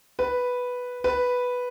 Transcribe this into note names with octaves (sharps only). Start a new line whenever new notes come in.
B4
B4